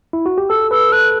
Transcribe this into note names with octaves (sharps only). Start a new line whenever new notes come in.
E4
F#4
G4
A4 E6
B4 E6
A4 F#6